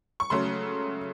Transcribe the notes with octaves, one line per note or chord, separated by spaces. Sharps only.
C#6
C#3 F#3 A3 C6